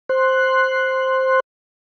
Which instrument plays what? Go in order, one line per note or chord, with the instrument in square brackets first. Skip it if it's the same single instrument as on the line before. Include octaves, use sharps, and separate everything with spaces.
[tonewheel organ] C5 C6 F#6